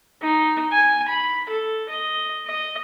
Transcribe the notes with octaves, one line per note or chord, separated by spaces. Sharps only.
D#4
G#5
B5
A4
D#5
D#5